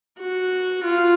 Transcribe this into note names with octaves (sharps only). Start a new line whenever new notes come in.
F#4
F4